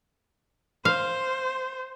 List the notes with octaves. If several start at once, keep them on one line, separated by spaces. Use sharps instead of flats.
C5 F5